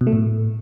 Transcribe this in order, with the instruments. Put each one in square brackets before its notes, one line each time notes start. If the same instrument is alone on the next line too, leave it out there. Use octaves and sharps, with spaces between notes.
[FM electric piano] B2
A3
A2